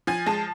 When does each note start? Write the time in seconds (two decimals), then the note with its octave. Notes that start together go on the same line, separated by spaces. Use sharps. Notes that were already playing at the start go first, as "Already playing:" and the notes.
0.07 F3 G#5
0.26 G#3 A5